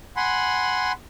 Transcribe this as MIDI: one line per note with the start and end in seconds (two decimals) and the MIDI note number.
0.17 0.92 78
0.17 0.92 80
0.17 0.92 83
0.17 0.92 84